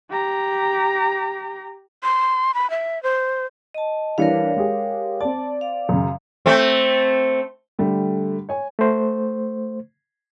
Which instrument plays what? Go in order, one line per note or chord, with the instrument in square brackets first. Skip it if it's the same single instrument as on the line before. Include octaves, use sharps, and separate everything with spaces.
[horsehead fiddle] G4 A#5
[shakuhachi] C6
B5
E5
C5
[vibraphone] D#5 A5
[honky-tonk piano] E3 G3 D4 [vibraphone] A#4 C#5 F5
[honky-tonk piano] G#3 G4 G#4
[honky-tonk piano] C4 D5 [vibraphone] A5
[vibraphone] F5
[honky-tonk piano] F#2 C#3
[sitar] A3 C4
[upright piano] D3 G3 A3
C#5 G#5
[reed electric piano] A3 C5